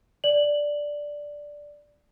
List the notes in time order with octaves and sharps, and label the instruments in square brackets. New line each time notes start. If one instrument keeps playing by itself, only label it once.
[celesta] D5 F#7